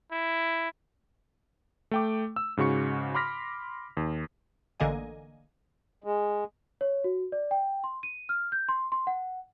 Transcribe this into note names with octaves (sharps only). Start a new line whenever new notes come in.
E4
A3 G5 D6
E6
G#2 C#3 F#4 C#6 C#7
B5 C6 D6 F6 A#6 B6
D#2
A1 D3 A#3 D#5 G#5
G#3
C#5
F#4
D5
G5
C6
D#7
F6
G6
C6
C6
F#5